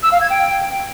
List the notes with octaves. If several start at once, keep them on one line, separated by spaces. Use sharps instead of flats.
E6
F5
G#6
G5